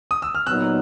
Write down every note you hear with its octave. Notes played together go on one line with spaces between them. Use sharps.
D#6
E6
F6
A#2 F#3 B3 D#4 E6 F#6